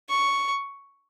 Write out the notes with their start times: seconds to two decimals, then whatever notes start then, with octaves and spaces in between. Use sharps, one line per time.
0.09 C#6